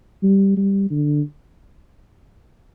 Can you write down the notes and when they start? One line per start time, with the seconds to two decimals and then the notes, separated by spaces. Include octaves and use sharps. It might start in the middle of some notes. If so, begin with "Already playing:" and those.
0.23 G3
0.57 G3
0.91 D3